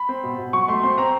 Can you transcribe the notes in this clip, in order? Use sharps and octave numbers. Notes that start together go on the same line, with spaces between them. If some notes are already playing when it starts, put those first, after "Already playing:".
Already playing: B5
C4
B2
B2
F#3 C#6
A3 C6
C4 C6
C4 A#5